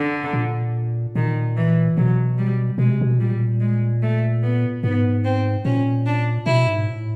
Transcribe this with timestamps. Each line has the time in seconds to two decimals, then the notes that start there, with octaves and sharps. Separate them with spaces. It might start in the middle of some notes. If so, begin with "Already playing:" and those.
Already playing: D3
0.33 A#2
1.15 A#2 D#3
1.56 E3
1.96 B2 F#3
2.37 G3
2.78 B2 G#3
2.90 C3
3.01 B2
3.19 A#2 G3
3.60 G#3
4.02 A3
4.42 B3
4.83 G#2 B3
5.24 C4
5.64 A#2 C#4
6.05 D4
6.46 B2 E4
6.67 G#2
6.88 A2